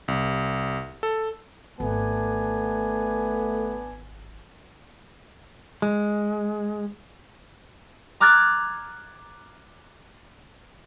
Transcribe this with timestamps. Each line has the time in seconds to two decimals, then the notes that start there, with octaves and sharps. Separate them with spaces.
0.08 C2
1.03 A4
1.80 G#1 A3 B3 D4 G#5
5.82 G#3
8.20 A#5 D6 F6 F#6 G#6 A6